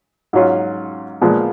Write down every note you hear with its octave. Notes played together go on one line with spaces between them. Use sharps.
G#2 F#3 C#4 F4
A#2 F3 G#3 B3